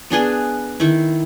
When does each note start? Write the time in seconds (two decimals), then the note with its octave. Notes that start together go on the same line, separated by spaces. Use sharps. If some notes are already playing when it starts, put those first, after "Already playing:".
0.10 B3 D4 G#4 B4
0.80 D#3 E4